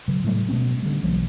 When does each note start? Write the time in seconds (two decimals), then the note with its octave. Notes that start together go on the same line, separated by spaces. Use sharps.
0.08 C#3 F#3
0.24 A2 F#3 G3 A3
0.49 B2 A3 B3 C#4
0.82 D3 G3
1.03 B1 E3 F#3 A#3